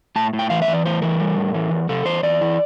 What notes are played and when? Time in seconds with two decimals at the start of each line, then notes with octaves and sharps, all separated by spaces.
0.16 A2 A5
0.33 A2
0.39 G5
0.50 E3 F5
0.62 E5
0.68 E3
0.73 D5
0.85 A2 C5
1.02 E3 A#4
1.20 G3
1.37 A2
1.55 E3
1.71 E2
1.89 C3 A4
2.05 E2 C5
2.23 E2 D5
2.41 E3